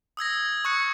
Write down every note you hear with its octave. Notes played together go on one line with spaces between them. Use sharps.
D#6 E6 G#6 A#6
C#6 D#6 F#6 C#7